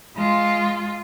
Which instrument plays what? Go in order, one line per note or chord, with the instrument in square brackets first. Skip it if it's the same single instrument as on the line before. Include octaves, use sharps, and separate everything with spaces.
[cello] G#3 F4